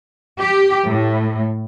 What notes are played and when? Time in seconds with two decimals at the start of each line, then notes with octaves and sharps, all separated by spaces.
0.39 G4
0.88 A2